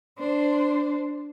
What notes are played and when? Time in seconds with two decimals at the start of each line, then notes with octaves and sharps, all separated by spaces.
0.19 D4 C5